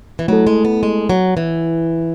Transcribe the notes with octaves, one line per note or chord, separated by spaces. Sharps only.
E3
F#3 A3 E4 A4
G#3
B3
G#3
F#3
E3